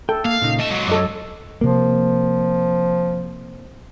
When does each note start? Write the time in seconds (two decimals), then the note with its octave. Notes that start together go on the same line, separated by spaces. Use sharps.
0.09 A4 G5
0.25 A#3 F5
0.42 A#2 C#3 D#4
0.59 A3 D#5 A5
0.70 G#2 F#3
0.87 F#2 A4 D#5 D6
1.61 C3 F3 A#3